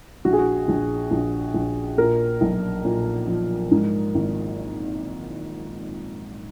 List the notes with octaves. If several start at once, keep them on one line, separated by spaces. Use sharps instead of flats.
A#1 F#4
G#4
F#4
A#1
A#1
A#1
A#2 A#4
B1
A#2
F3
G#2
G#1